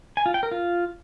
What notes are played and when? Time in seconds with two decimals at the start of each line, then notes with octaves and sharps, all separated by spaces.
0.17 G#5
0.26 F4
0.34 G5
0.43 A#4
0.51 F4